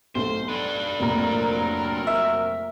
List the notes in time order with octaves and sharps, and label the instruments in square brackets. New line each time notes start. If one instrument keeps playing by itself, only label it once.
[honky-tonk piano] B1 A3 [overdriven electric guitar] C5
[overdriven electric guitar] D4 B4
[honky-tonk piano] F1 A#1 A#5 [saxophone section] F#3 C4 A#4
[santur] E5